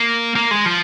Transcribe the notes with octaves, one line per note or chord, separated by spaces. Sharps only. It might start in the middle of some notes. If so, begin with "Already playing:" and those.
Already playing: A#3
A#3
G#3
F3